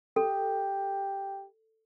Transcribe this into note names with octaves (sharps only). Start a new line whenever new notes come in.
G4 A4